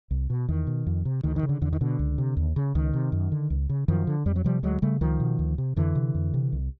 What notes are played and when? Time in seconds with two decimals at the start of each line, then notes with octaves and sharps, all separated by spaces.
0.11 C2
0.30 B2
0.49 E2 D#3
0.67 B2
0.87 F2
1.05 C3
1.23 D2 D#3
1.36 D#3
1.43 C#3
1.49 D3
1.61 E2 D3
1.73 D#3
1.81 B2 D3
1.99 C#2
2.18 C3
2.37 D#2
2.56 C#3
2.75 C#2 D#3
2.93 C3
3.12 F#2
3.32 D3
3.50 C#2
3.69 C#3
3.88 F#2 D#3 F3
4.07 D3
4.26 F2 G3
4.36 F#3
4.44 C3 F3 G3
4.63 D2 F#3 G#3
4.82 C#3 G3 A3
5.01 C#2 D#3 F3
5.20 B2
5.39 D2
5.58 C3
5.76 F2 D3 E3
5.95 C3
6.15 F2
6.34 C3
6.52 C2